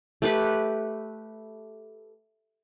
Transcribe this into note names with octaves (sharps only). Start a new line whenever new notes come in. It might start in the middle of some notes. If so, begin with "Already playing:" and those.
A3 G4 B4